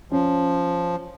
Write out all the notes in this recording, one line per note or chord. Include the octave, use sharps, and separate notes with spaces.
F3 C#4